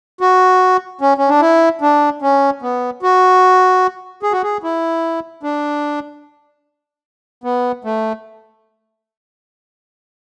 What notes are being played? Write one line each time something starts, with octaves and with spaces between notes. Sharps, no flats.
F#4
C#4
C#4
D4
E4
D4
C#4
B3
F#4
G#4
F#4
G#4
E4
D4
B3
A3